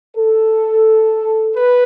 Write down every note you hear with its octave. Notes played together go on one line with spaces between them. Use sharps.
A4
B4